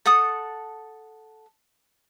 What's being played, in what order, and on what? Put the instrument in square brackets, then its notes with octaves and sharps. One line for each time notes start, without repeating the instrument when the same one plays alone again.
[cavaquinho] A4 F#5 A5 D#6